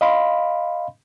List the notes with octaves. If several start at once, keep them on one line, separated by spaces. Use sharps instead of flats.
D#5 F5 B5 C6